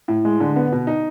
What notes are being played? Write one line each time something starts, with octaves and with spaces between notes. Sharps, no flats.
A2
G#3
D3
B3
B2
D#4